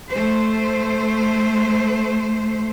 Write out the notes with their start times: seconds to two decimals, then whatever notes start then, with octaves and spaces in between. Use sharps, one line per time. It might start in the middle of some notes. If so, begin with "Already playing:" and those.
0.11 A3 C5